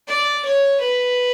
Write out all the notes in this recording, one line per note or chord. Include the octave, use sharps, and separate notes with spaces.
D5
C#5
B4